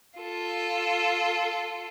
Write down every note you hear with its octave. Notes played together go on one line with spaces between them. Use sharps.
F4 A4